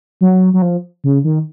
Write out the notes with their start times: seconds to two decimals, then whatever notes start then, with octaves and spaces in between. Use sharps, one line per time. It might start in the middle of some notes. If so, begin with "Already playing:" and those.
0.21 F#3
0.53 F#3
0.62 F3
1.04 C#3
1.24 D#3